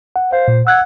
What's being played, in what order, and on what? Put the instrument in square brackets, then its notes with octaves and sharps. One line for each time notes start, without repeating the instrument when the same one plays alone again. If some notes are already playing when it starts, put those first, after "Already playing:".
[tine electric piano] F#5
[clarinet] C5 [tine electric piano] F5
[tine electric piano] A#2
[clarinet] F#5 [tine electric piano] E6 F#6 G#6